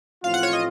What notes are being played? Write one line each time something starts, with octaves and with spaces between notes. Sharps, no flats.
A1 A2 F3 C4 F4 F5
F#5
C#5
D#5